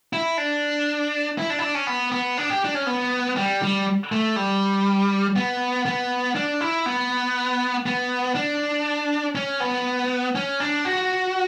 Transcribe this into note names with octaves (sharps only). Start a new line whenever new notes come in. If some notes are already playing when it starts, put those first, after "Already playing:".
E4
D4
E4
D4
E4
D4
C#4
B3
B3
D4
G4
D4
C#4
B3
G3
G3
A3
G3
B3
B3
D4
E4
B3
B3
D4
C#4
B3
C#4
D4
F#4